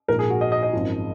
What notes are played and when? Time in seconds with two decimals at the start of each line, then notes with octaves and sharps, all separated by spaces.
0.08 A#1 G#2 F3 A#4
0.19 G#4
0.30 F#4
0.41 D#5
0.52 D#5
0.63 D#5
0.73 G#1 F#2 F3